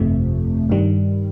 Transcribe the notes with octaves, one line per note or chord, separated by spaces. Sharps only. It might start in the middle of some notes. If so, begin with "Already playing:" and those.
Already playing: G1 F2 C3 F3 A3
G2 D#3 G3